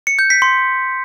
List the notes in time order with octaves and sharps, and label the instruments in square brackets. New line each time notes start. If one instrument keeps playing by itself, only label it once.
[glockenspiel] C#7
G6
B6
C6